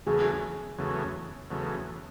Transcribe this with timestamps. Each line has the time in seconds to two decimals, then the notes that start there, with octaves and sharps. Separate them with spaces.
0.06 E2 C#3 F#3 A3 G#4
0.78 E2 C#3 F#3 A3
1.51 E2 C#3 F#3 A3